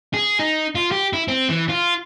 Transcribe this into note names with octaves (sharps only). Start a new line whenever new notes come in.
G#4
D#4
F4
G4
E4
C4
E3
F4